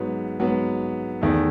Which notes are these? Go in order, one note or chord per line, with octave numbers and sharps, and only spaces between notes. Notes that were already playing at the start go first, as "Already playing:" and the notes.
Already playing: G#2 F#3 B3
G#2 F#3 B3
E2 D#3 A3